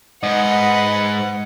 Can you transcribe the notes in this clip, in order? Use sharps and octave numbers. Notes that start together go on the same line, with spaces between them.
G#2 B4 D#5 F#5